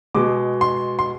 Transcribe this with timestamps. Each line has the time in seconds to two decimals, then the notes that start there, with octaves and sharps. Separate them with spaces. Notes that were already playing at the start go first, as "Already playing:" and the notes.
0.15 B2 G#3 D6
0.61 C6
0.99 C6